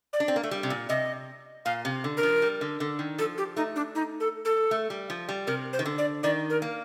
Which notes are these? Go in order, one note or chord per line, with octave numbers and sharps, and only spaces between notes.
D5
D4
C4
A#3
A3
G3
C3
A#2
C3 D#5
A#2 F5
C3
D3
A#4
F3
G3
D3
D3
D#3
F3 A4
G4
A3 D#4
D4
D#4
A4
A4
A3
G3
F3
G3
C3 A#4
C5
D#3
D3
D5
D#3 D5
A#4
A#3